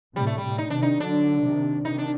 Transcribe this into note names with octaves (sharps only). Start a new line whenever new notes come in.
A2 C3 G3
A3
G3
A2 C3
D#4
C3 D#3 D4
D#4
D3 F#3 D4
C3 D#3
C3 D#3 D#4
D4